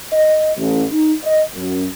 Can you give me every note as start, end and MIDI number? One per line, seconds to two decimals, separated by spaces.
0.13 0.52 75
0.57 0.85 33
0.91 1.13 63
1.24 1.44 75
1.55 1.87 42